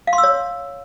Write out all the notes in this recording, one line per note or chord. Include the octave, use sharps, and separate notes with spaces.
F5
C6
E6
C#5